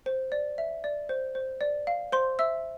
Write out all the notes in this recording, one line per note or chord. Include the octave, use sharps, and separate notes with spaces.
C5
D5
E5
D5
C5
C5
D5
F5
C5 C6
E5 E6